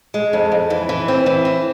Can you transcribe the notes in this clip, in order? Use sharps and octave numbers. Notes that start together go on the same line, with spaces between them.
G#3
F2
F2
E3
E3
C4
E3
C4